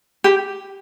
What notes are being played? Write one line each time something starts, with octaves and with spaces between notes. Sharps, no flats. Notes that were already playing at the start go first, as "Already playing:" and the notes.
G4